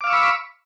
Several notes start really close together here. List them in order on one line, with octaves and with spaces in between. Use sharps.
D6 F5 E6 C#6 B5